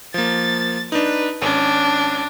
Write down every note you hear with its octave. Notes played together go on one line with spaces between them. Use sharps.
F3 A#3 A6
D4 D#4 B4
G#1 C#4 D4